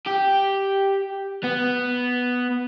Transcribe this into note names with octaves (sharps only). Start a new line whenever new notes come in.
G4
B3